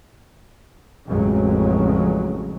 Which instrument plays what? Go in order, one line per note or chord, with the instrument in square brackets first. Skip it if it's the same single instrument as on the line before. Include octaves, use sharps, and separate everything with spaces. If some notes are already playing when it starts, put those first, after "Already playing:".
[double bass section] A1 F2 C#3 F#3 G#3